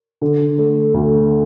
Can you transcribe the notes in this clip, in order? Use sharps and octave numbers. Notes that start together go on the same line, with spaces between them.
D3
A3
D2